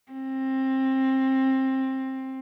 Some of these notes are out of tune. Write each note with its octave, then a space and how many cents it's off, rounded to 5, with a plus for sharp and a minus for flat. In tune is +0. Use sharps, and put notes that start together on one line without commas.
C4 +20